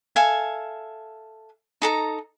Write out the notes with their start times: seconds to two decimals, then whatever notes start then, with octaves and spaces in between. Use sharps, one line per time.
0.16 A4 E5 F5 G#5
1.82 D#4 A4 A#5